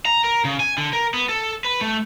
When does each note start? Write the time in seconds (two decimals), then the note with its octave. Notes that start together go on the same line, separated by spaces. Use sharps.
0.06 A#5
0.24 A#4
0.45 C#3
0.60 G#5
0.78 D3
0.93 A#4
1.14 B3
1.29 A4
1.64 B4
1.81 A3